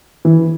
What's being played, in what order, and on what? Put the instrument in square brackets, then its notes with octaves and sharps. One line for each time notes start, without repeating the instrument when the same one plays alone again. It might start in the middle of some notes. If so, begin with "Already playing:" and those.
[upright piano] E3